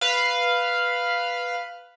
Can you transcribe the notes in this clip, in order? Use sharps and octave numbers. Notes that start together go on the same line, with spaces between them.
B4 F5